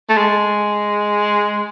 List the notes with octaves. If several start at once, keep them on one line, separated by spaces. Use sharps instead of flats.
A3
G#3